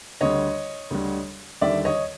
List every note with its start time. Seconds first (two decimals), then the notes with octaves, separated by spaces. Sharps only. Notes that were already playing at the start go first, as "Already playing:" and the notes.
0.21 D2 D3 G3 C#5 D#5
0.91 D2 D3 G3
1.61 D#2 D3 G3 D5 E5
1.85 C#5 D#5